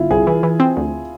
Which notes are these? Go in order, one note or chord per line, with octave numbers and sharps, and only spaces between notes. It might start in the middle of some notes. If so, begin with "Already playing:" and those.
Already playing: G1 E4 F4
C2 G#4
E3
E3
C4
D2